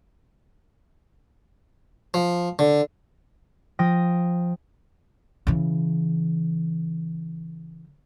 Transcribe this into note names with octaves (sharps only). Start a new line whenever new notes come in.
F3
D3
F3 G5 D#6 A#6
C#3 E3